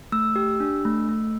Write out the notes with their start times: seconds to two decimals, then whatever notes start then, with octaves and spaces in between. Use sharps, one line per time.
0.12 A3 E6
0.36 G4
0.60 D4
0.85 A3
1.08 A3